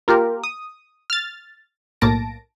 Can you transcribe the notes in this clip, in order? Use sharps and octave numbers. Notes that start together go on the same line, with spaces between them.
A#3 F4 G4 A#4
D#6
F6 A6
B1 A2 A#3 A5 A#6 D7